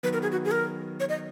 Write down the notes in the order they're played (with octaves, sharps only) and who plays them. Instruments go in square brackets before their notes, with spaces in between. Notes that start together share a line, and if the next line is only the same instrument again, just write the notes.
[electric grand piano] D#3 F#3 B3 [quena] B4
[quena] A#4
G#4
F#4
G#4
A#4
C#5
D#5